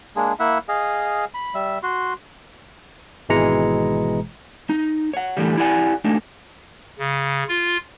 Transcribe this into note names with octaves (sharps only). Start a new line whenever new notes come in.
G#3 A#3 D4 G#4
A#3 E4 E5 F#5
G#4 D#5 F5
B5
G3 E5
F#4 C6
G#1 B2 E3 G#3 A#5 C#7
D#4
C#5 F#5
A2 D3 E3 G3
E4 G4 D5 F#5 G#5
D2 A3 D4 D#4
C#3
F4